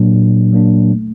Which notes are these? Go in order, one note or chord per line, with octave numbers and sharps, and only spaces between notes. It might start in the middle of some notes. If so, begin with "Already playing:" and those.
Already playing: A#2 F#3 A#3 D4
A#2
F#3 A#3 D4
A3